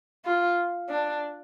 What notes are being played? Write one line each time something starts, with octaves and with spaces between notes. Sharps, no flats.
F4
D4